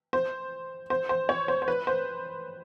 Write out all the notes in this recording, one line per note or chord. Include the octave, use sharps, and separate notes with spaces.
C5
C5
C5
C#5
C5
C5
B4
C5